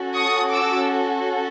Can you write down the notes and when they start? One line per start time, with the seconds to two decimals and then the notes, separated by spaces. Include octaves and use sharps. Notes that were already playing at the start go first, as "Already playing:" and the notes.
Already playing: C#4 F#4 A4
0.16 C#6 D#6
0.51 D6 E6